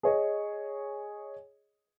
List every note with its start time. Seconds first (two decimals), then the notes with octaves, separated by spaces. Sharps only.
0.03 G#4 C#5 D#5